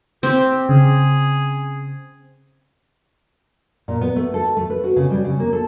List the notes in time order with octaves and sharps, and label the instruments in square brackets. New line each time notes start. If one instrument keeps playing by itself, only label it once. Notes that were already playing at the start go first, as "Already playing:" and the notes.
[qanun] C4 [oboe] G4
[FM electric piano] C#3 [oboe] G#4
[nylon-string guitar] A#2
B3
A3
A4
A3
B4
F#4
C#3
G3
C#3
A#3
A4